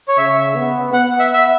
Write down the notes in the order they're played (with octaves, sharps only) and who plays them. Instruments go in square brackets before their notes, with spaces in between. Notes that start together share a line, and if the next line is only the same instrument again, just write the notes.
[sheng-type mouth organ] C#5
[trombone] C#3 [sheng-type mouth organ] E5
[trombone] B3
[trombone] B3 [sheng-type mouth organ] F#5
[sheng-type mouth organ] E5
E5